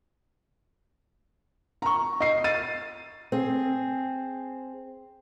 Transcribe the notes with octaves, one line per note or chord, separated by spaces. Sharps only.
A#5 C#6
D#5 C7
A6 D#7
C4 G#4